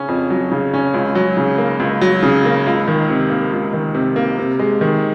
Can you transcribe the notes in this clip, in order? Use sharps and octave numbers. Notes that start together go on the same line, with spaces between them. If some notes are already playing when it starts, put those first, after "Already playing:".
Already playing: C#3 C#4
F2
F#3
C#3
C#4
C#2
F#3
C#3
A#3
C#2
F#3
C#3
A#3
C#2
D#3
C3
A#3
C#2
D#3
C3
A#3
C3
G#3
D#3